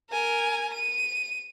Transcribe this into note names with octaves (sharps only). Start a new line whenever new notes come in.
A#4 G#5
D#7